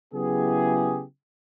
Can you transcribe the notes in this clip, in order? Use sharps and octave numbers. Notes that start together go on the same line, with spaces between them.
C#3 F#3 B3 E4 G4 G#4